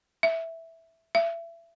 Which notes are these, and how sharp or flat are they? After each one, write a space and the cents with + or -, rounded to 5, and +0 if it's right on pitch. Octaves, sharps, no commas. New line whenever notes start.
E5 -5
E5 +30